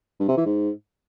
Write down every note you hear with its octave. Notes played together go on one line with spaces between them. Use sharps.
G2
C3
E3
G#2